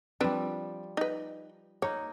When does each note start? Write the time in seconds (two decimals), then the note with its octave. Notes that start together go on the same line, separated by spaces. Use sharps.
0.21 F3 G3 C4 D4 B4
0.97 D#4 B4
1.82 A#3 D#4 C#5